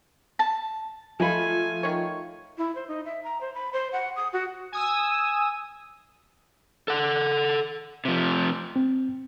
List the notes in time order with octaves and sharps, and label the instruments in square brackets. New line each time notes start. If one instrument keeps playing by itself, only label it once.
[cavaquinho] A5
[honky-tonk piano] F3 [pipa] G#3 B5 [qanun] A3 F4 A4 [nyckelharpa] G#5
[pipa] D#3 C#5
[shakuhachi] E4
C5
D#4
E5
A#5
C5
B5
C5
F#5
D#6
F#4
[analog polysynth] G#5 D#6 E6
[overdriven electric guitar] A4 F#5
C3 F3
[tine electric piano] C4